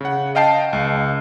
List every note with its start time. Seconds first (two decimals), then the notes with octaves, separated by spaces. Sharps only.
0.01 C#3 F#5
0.35 D#5 F5 G5 A5 C7
0.73 C#2